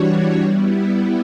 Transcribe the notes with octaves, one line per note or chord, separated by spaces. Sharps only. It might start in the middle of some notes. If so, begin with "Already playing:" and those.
Already playing: E3 G3 D4 F#4 C#5
G3 B3 E4